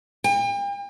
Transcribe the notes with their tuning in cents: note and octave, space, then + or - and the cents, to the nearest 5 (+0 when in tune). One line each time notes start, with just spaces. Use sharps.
G5 +40